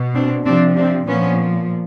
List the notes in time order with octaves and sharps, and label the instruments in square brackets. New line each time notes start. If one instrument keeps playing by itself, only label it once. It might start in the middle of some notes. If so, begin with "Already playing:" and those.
Already playing: [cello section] B2
C4 D4
C3 F3 C4 D4
C4 D4
A#2 F3 B3 C#4